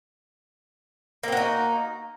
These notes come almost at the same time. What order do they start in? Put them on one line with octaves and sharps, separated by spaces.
A#3 C4 F#4 D#4